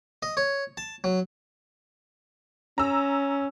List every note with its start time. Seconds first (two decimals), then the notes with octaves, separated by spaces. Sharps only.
0.23 D#5
0.37 C#5
0.77 A5
1.04 F#3
2.78 C#4 A#5 E6